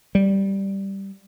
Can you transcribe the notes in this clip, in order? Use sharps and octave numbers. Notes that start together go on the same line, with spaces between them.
G3